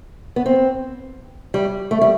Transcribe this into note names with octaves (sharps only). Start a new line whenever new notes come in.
B3
C4
G3
A3
G3